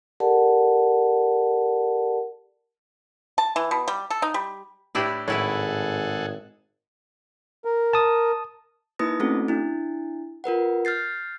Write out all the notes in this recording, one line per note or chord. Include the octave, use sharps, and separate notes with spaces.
G4 A4 A#4 D5 F#5 A5
A5
E3
B2
G3
A4
D#4
G3
A2 D4 E4 G4 B4
G#1 A2 E4 G#4 A4 B4 C#5 F#5
A#4
A5 D#6
A#3 D#4 E4 B4 D#6 A#6
A3 C4 C#4 F#4 A4
D4 E4
F4 A#4 B4 F#5
F6 G6 A6 C7